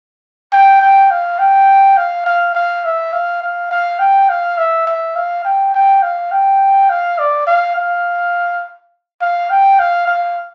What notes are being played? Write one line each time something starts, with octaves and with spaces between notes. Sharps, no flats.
G5
G5
F5
G5
F5
F5
F5
E5
F5
F5
F5
G5
F5
E5
E5
F5
G5
G5
F5
G5
F5
D5
F5
F5
F5
G5
F5
F5